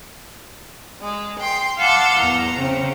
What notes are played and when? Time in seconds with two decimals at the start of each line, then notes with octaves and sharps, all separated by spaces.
1.02 G#3
1.38 G5 C6
1.78 F5 F#5 A5 C6 D6 E6
2.18 E2 A#5
2.57 C#3 C4